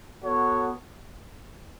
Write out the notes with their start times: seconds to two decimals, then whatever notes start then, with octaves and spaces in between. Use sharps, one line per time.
0.23 B3 F#4 A4 C#5